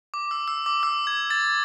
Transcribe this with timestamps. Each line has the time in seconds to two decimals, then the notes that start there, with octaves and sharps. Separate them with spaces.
0.14 D6
0.31 E6
0.48 E6
0.66 D6
0.83 E6
1.07 G#6
1.30 A6